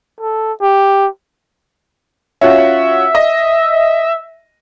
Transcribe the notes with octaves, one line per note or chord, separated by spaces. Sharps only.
A4
G4
C#4 F4 F#4 E5
D#5